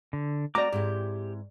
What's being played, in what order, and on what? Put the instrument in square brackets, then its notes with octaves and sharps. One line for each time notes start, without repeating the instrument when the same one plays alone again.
[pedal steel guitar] D3
[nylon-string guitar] A3 C4 F#4 [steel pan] D5 A#5 [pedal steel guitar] D6
[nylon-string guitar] G#2 C4 E4 [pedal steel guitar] G4